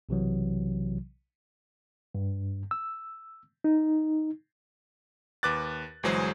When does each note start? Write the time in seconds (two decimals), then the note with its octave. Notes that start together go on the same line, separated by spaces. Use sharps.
0.09 B1 C3 E3 F#3
2.15 G2
2.71 E6
3.64 D#4
5.43 D#2 B4 D6 F#6 A6
6.03 G1 E3 F#3 G#3 G#4 C5